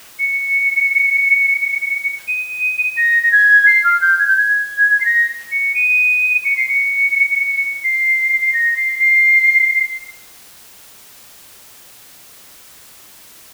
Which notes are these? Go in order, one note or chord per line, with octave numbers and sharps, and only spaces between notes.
C#7
D#7
A#6
A#6
G#6
C7
F6
G6
G#6
G6
G#6
C7
A#6
C#7
D#7
C#7
C7
C#7
C7
C7
A#6
C7
C7